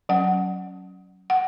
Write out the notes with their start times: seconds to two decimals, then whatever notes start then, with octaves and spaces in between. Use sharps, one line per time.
0.09 F#3 C#4 F#5
1.30 F#5